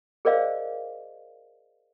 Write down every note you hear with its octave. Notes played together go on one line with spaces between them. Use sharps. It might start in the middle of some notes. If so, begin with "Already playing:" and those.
G#4 A#4 C5 D5 D#5 F5